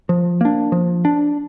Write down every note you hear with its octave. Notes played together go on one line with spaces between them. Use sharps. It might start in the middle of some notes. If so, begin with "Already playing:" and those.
F3
A#3 D4
F3
D4